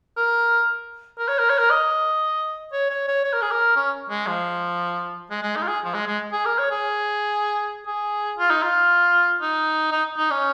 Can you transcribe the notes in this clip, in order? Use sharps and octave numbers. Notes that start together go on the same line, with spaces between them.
A#4
A#4
C#5
A#4
C#5
A#4
D#5
C#5
C#5
C#5
C#5
A#4
G#4
A#4
C#4
G#3
F3
G#3
G#3
D#4
F4
G#4
F3
G#3
G#3
G#4
A#4
C#5
G#4
G#4
F4
D#4
F4
D#4
D#4
D#4
C#4